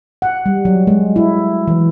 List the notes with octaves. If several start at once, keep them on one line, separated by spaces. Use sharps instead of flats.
F#5
G3
F#3
G#3
E4
E3